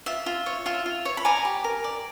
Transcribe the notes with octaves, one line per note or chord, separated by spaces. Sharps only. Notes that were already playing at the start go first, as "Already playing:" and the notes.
F4 E5
F4
C#5
F4 E5
F4
C#5
B5
D5 G#5 A#5
G4
A#4
D5